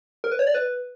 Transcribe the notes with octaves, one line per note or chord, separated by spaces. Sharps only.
A#4
B4
C#5
D5
B4